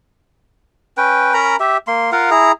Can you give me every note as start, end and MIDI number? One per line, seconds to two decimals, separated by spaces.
0.97 1.34 61
0.97 1.34 71
0.97 1.34 79
1.34 1.56 61
1.34 1.56 70
1.34 1.56 82
1.34 1.56 83
1.60 1.77 67
1.60 1.77 76
1.87 2.11 58
1.87 2.11 84
2.12 2.30 65
2.12 2.30 70
2.12 2.30 77
2.12 2.30 78
2.31 2.52 64
2.31 2.52 68
2.31 2.52 82